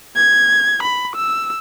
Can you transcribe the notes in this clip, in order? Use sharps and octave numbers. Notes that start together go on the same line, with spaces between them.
G#6
B5
E6